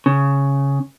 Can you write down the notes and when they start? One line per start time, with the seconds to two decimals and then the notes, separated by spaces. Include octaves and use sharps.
0.06 C#3